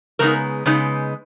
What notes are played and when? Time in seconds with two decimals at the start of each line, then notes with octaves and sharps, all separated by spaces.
0.19 C#3 G#3 B3 D#4 A#4
0.66 C#3 G#3 B3 D#4